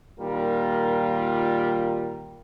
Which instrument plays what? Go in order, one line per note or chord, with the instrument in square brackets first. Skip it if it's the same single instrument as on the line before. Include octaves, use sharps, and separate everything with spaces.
[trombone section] A#2 D#3 G3 F4 A#4